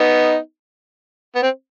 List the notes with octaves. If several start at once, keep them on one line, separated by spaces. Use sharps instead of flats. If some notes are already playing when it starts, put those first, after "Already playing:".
Already playing: B3 D#4
B3
C4